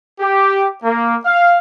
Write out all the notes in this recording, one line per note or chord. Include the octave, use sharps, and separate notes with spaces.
G4
A#3
F5